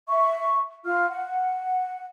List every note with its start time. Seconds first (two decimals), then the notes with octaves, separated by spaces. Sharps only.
0.08 E5 C#6
0.85 F4 F5 F6
1.10 F#5